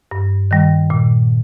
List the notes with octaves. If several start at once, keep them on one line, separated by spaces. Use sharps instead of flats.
G2
D#3 G3
A#2